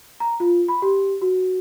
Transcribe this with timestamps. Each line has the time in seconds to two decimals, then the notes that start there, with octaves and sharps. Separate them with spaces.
0.20 A#5
0.40 F4
0.68 B5
0.82 G4
1.22 F#4